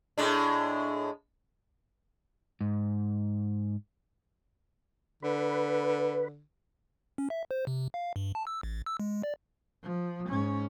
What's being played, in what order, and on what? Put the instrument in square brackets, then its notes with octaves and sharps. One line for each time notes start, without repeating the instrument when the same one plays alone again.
[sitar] A2 G#3 D4
[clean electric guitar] G#2
[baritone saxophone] D3 [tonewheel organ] B4
[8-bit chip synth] C#4
E5
C5
C3
F5
G2
A5
E6
A1
E6
G#3
D5
[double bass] F3
G#2 C#4